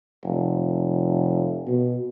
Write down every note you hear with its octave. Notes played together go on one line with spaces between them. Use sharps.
F1
B2